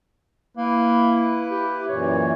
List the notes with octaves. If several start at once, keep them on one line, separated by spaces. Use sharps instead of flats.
A#3 E4 B4
G4
F#2 A#2 E3 C#5